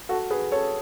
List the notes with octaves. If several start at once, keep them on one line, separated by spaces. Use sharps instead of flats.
F#4 A4
G#4 B4
A4 C#5